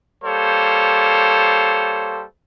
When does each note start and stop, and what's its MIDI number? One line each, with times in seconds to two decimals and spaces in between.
0.23 2.24 55
0.23 2.24 58
0.23 2.24 69
0.23 2.24 72
0.23 2.24 73